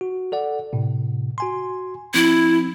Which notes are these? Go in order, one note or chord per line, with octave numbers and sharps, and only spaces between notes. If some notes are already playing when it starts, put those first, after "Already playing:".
F#4
A4 D5 F#5
A2 C3
F#4 G#5 C6
F3 C4 E4